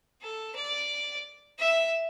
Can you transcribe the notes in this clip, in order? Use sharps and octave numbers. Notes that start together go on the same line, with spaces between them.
A4
D5
E5